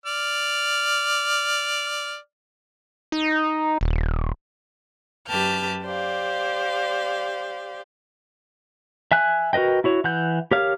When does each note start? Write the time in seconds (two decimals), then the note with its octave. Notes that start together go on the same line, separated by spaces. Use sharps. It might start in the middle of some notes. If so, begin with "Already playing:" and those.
0.06 D5 F6
3.12 D#4
3.81 D#1
5.28 F#2 G4 B4 A5 F6 G6
5.83 G4 C5 D5 F5
9.12 E5 G#5 F#6
9.53 F#4 A#4 B4 D#5 G5
9.84 E4 F#4 C#5
10.04 E3 F#5 G6
10.51 G4 A#4 C#5 F5 F6